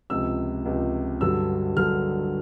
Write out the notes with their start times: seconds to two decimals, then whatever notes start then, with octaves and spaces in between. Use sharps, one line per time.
0.10 C#2 C3 F3 E6
0.65 C#2 C3 F3
1.21 G2 D3 F#3 E6
1.76 G2 D3 F#3 F6